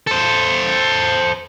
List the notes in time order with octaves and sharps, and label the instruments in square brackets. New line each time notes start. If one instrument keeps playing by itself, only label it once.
[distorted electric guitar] A4 C5